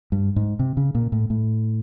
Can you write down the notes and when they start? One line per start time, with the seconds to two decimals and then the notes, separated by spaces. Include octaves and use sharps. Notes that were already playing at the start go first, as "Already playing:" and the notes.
0.12 G2
0.36 G#2
0.59 C3
0.77 C#3
0.95 A#2
1.12 A2
1.30 A2